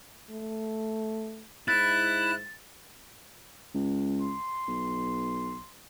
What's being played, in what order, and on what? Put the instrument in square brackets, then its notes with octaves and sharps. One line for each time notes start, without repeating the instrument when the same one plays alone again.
[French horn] A3
[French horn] G#2 [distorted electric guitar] E4 [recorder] F#6 [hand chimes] A6
[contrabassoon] C#2
[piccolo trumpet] C6
[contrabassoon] B1